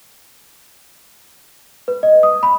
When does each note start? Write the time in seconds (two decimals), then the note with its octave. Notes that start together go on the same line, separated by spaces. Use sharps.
1.88 B4
2.03 D#5
2.23 D#6
2.43 B5